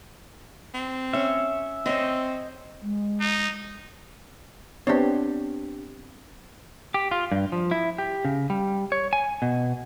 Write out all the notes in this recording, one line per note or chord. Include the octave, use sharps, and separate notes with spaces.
C4
C#4 C#5 E5
C4 C5 C#5 D#5
G#3
D#4
B3 C4 D4 G4 C#5
G4
F4
G2
F3
E4
G4
C#3
G3
C#5
G#5
B2